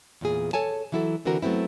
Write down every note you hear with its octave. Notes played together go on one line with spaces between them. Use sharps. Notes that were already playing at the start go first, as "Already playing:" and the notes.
E2 A#2 G#4
A4 C#5 G#5 A5
E3 F#3 E4 F#4 A4
D3 E3 C4 F#4 A#4
F#3 A3 B3 C4 E4